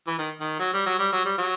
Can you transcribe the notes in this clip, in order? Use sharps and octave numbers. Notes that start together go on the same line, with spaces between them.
E3
D#3
D#3
F#3
G3
F#3
G3
F#3
G3
F#3